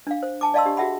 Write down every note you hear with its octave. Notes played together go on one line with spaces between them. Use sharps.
D4 F5
C5
G#5 A5 D6
D5 D#5 F5 A5 C6 E6
D4 G4
F#4 G#4 E5 F#5 B5